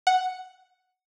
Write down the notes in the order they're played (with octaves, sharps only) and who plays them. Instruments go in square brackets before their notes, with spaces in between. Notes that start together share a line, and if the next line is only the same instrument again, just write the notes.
[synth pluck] F#5